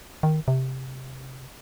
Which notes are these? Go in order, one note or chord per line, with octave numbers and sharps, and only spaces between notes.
D#3
C3